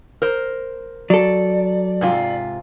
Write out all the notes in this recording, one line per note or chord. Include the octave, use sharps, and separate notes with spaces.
A#4 C5
F#3 A4 D5
G#2 C3 F4